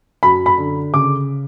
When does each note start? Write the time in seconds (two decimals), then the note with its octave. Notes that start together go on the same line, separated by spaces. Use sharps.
0.23 F#2 B5
0.46 B5
0.57 D3
0.93 C#3 D6